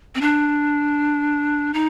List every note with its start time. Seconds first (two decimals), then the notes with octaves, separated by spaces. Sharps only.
0.15 C4
0.21 D4
1.74 D#4